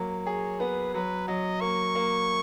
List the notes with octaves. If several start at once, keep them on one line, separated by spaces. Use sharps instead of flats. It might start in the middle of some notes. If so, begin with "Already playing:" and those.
Already playing: F#3 A#3
G#4 C#5
B3 B4
F#3 B4
F#3 D#5
A#3 C#6
A#3